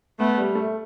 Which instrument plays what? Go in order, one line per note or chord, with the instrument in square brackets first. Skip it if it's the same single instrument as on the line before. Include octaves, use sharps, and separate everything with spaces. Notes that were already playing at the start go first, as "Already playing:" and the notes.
[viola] A3 [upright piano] B3
[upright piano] G3
A3